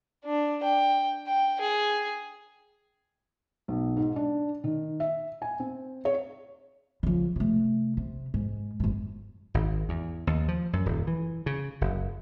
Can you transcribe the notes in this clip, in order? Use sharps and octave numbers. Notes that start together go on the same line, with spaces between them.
D4
G5
G5
G#4
B1
G#2
D4
D#3
E5
G#5
C4
C#5
C#3 F3
C3 A3
C3
G#2
G1 G#2
G#1
E2
D#2
F3
F#2
D#1
E3
C#3
F#1